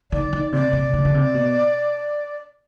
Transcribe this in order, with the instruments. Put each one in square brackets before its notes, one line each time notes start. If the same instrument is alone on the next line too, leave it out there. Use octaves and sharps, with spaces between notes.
[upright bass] D#3 [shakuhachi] D5
[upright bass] D#3
[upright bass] C3 [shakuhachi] D5
[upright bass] C3
D3
D3
C3
B2